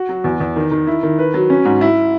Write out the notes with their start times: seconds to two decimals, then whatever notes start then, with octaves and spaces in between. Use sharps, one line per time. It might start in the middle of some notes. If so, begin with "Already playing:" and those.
Already playing: F#4
0.09 F#3
0.24 E2
0.40 E2
0.56 D#3
0.71 D#3
0.87 E4
1.03 D#3
1.19 B4
1.34 F#3
1.50 C#4
1.65 G#2
1.81 E4